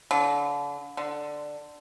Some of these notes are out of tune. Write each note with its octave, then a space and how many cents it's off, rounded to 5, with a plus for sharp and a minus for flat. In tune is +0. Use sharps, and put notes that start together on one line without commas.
D3 -35
D3 +10